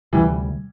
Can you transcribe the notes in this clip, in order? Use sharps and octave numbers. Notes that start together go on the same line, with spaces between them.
D2 C3 E3 G3